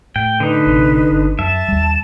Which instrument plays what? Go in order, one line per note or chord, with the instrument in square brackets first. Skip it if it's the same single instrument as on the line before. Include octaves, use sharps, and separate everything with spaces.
[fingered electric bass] A2 [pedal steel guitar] G5
[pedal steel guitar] D3 D#4 [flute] B4
[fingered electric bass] A1 C3
G1
[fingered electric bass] F#2 [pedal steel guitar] E5 [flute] A5
[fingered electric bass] D#2 G3